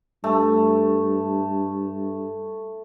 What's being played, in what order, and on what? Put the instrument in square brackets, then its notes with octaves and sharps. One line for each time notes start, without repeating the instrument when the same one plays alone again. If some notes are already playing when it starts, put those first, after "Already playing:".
[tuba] G2 [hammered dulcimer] A3